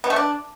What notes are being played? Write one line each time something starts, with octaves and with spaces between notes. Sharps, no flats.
B3
A3
D4